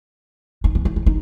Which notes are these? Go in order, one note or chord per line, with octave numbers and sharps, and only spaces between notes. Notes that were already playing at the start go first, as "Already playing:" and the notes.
D#4
B3
D#4
D#4
D#4